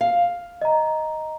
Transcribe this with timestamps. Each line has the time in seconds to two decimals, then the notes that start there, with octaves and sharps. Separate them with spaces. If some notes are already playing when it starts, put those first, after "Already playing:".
0.01 F5
0.62 D#5 A#5